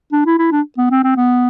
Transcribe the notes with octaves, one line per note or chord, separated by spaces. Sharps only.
D4
E4
E4
D4
B3
C4
C4
B3